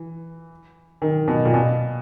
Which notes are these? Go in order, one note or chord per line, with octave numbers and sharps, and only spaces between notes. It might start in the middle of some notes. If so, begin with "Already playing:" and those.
Already playing: E3
D#3
B2
A#2
B2